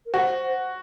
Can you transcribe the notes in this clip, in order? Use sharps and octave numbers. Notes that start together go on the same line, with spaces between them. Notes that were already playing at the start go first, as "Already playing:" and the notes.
A#4
F#4 C5